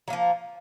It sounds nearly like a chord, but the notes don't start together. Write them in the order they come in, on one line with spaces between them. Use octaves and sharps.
F#3 A#3 F3